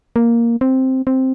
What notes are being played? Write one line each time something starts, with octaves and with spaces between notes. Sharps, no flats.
A#3
C4
C4